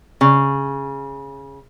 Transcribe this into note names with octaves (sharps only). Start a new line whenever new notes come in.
C#3